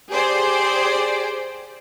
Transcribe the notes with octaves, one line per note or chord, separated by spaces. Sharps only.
G4 G#4 C5 D5